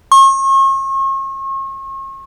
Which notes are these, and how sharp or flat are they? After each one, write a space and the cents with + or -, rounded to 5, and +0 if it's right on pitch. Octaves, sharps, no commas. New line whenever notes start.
C#6 -40